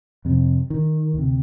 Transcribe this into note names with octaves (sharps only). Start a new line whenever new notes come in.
F2 C3
D#3
D2 C3